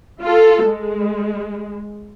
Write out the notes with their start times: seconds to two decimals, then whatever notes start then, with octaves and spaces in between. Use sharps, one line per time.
0.23 F4 A4
0.65 G#3